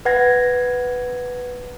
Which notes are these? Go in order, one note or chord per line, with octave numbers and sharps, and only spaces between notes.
B4 F#5 G#6 A#6